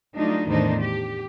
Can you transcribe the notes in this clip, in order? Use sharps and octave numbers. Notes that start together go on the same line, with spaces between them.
F#3 G3 A3 D4 D#4 F4
E2 A2 D#3 D4 D#4 C5
G4